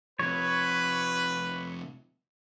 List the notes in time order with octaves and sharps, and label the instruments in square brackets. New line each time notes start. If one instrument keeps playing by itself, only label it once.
[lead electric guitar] C3 F3 [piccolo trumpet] B4 [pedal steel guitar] C#5